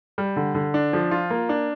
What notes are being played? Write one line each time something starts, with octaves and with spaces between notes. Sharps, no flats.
G3
D3
D3
D4
F3
F4
A#3
D4